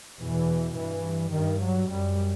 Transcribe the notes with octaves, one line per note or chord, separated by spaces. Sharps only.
E2 B2 E3
G2 E3
G2 D#3
F#3
F#2 G3